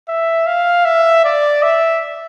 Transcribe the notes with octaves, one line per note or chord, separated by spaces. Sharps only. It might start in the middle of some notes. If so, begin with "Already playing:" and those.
E5
F5
E5
D5
E5